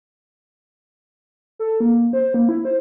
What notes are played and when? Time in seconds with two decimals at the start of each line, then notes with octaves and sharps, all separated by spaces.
1.59 A4
1.80 A#3
2.13 C5
2.34 A#3
2.49 E4
2.65 C5